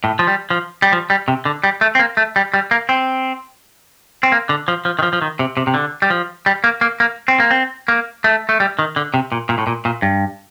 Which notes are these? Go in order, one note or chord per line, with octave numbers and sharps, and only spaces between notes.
A2
F3
G3
F3
G3
F3
G3
C3
D3
G3
A3
C4
A#3
A3
G3
G3
A#3
C4
C4
A#3
D3
F3
F3
D#3
F3
F3
D#3
C3
C3
C3
D3
G3
F3
G3
A#3
A#3
A#3
C4
A#3
C4
A#3
A3
A3
G3
D#3
D3
C3
A#2
A#2
A2
A#2
A#2
G2